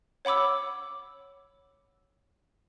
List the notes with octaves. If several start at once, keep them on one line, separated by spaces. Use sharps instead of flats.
C#5 F#5 B5 D6 E6